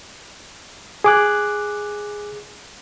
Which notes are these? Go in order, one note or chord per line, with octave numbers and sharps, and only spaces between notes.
G#4 D6 F#6